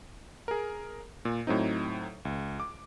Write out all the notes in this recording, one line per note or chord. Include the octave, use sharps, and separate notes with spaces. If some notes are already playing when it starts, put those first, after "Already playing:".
G#4 A#4
A#2
A2 F#3 C4 D#4
C#2
D6